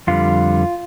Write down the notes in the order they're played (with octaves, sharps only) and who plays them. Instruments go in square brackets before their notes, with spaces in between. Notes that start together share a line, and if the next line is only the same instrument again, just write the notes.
[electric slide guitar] F2 D3 G3 F4